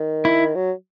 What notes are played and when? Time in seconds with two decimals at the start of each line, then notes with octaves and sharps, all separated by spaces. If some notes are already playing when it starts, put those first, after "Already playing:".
Already playing: D#3
0.25 E4
0.55 F#3